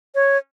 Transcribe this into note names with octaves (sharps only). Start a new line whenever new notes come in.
C#5